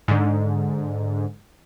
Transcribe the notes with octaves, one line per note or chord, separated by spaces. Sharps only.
G#2 D3